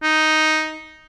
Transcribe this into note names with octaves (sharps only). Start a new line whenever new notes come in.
D#4